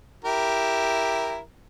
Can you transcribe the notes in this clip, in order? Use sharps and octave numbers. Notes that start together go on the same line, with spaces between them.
E4 G4 A#4